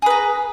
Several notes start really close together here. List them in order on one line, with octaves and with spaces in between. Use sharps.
G#4 B4 A#5